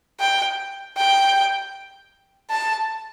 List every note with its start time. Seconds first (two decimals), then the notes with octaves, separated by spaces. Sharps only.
0.20 G5
0.97 G5
2.50 A5